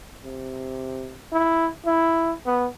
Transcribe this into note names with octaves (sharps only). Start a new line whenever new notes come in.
C3
E4
E4
B3